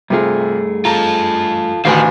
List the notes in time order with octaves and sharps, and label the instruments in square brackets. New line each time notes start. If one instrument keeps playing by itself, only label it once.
[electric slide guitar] G2 A3 G#4 [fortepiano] C3 F4
[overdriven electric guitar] F4 A4 [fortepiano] A#5
[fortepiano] A1 D2 [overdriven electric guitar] D#3 [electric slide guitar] F5 G#5